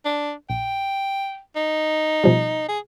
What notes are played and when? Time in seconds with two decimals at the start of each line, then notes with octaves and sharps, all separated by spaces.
0.05 D4
0.50 A#1 G5
1.56 D#4
2.24 B2 F3 G3
2.69 G#4